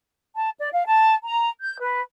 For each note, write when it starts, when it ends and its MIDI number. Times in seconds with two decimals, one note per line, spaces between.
0.35 0.50 81
0.59 0.68 74
0.73 0.84 77
0.87 1.14 81
1.24 1.49 82
1.62 1.80 91
1.80 2.01 71